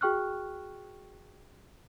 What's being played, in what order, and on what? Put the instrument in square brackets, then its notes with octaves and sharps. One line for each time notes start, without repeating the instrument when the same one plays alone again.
[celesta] F#4 G#4 G5 C#6 F6 F#6